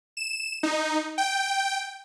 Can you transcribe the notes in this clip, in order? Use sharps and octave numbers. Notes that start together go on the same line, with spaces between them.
E7
D#4
G5